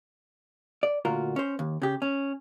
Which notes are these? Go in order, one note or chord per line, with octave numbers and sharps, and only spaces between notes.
D5
D2 A#2 F4 F#4 A#4
C#4 C5
D#2
C#3 G4
C#4